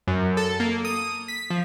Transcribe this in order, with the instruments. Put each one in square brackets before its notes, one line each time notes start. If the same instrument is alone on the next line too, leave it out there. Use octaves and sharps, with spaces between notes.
[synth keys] F#2
A4
A#3
D#6
B6
F3